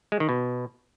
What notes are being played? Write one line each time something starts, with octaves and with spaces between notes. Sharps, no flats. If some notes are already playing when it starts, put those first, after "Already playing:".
G#3
D#3
B2